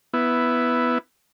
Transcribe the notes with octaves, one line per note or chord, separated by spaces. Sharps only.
B3 E4